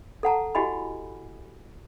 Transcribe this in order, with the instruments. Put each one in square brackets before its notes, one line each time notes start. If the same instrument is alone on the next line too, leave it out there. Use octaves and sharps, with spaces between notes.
[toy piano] A4 F#5 A5 A#5
E4 F#4 G4 D#5 G#5 B5